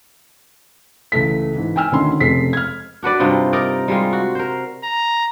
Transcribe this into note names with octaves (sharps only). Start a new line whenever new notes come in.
C#2 E3 A3 B6
G#2 E3
G5 G#5 E6 F6
D2 D#3 C#4 C6
F1 C#3 G#3 A4 B6 C7
F6 G#6
D4 F#4 B4 D5
G2 C3 D#4 F4
D#4 A#4 D5 D#5
G3 G#3 F4
F#4
A#4 C5
A#5